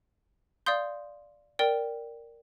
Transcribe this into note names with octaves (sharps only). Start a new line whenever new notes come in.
D5 F5 C6 D#6 G6
A#4 D5 G5